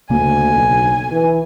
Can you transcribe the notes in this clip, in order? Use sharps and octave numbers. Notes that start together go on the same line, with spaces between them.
D2 C#3 A#3 G#5
B1
E3